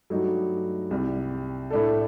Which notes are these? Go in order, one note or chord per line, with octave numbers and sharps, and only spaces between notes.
G2 F#3 A3 D#4 F#4
C2 C3 G3
A2 A3 D4 A4